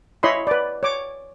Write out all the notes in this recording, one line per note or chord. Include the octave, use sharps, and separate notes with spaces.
E4 C#5 D#5 B5 C6
B4 D5
C#5 D6